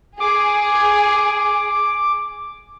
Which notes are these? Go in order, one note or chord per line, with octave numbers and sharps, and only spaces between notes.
G#4 D6